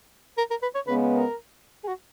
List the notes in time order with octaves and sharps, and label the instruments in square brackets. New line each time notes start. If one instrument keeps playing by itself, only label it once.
[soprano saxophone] A#4
A#4
B4
C#5
[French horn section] C#3 G#3 B3 [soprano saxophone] B4
[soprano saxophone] A#4
G#4
F#4